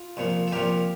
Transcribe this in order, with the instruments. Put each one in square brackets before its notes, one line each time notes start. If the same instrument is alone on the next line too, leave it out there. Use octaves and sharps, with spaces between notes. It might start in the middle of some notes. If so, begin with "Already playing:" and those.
Already playing: [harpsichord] F4
C2 A#2 F3
A4
C2 A#2 F3 G4 A#4